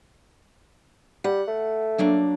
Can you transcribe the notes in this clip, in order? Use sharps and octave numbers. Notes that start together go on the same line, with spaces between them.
G3 F#5
A3
F#3 A#3 D4